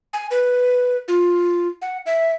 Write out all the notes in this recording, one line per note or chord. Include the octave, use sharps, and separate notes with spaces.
G#5
B4
F4
F#5
E5